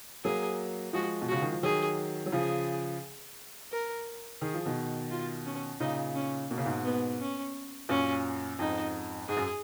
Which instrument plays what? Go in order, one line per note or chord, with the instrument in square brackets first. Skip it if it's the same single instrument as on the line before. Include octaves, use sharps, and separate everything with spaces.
[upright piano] F#3 A#3 [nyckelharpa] G#4
[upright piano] F3 G#3 [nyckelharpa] F#4
[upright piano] B2
[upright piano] C#3 [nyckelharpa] F#4
[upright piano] D#3
F3
[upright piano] D#3 F#3 [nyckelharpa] G#4
[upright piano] F#3
[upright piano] C#3 F3 [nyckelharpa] G#4
[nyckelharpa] A#4
[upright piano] D#3 [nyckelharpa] G#4
[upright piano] F3
B2 D#3
[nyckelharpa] F4
C#4
[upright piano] A#2 C#3 [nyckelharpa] D#4
[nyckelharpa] C#4
[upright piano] B2 [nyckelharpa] A#3
[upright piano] C#3
G#2 B2
[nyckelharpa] B3
C#4
[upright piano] F#2 A#2 [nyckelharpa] C#4
[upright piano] F2 G#2 [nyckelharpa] D#4
[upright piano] G#2 [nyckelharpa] G#4
[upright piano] F#2